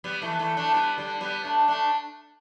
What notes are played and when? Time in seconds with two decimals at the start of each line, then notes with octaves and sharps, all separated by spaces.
0.04 G3 B3
0.22 E3 A3
0.32 B3
0.39 E3 A3
0.57 A3 D4
0.74 G3 B3
0.98 D3 G3
1.21 G3 B3
1.44 A3 D4
1.68 A3 D4